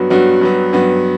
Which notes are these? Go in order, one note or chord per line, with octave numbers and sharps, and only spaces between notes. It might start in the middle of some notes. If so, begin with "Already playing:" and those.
Already playing: G2 F#3 B3 F#4
G2 F#3 B3 F#4
G2 F#3 B3
G2 F#3 B3